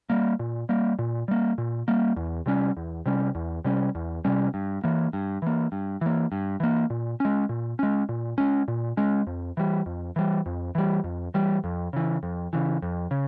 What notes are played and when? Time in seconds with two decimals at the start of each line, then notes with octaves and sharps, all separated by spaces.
0.10 G3 A#3
0.40 A#2
0.69 G3 A#3
0.99 A#2
1.28 G3 A#3
1.58 A#2
1.88 G3 A#3
2.17 E2
2.46 C3 G3 C#4
2.77 E2
3.06 C3 G3 C#4
3.35 E2
3.65 C3 G3 C#4
3.95 E2
4.25 C3 G3 C#4
4.54 G2
4.84 E3 A#3
5.13 G2
5.42 E3 A#3
5.72 G2
6.01 E3 A#3
6.32 G2
6.60 E3 A#3
6.90 A#2
7.20 G#3 C#4
7.49 A#2
7.79 G#3 C#4
8.09 A#2
8.38 G#3 C#4
8.68 A#2
8.97 G#3 C#4
9.27 F2
9.57 E3 G3
9.86 F2
10.16 E3 G3
10.46 F2
10.75 E3 G3
11.04 F2
11.34 E3 G3
11.64 F2
11.93 C#3 E3
12.23 F2
12.53 C#3 E3
12.83 F2
13.11 C#3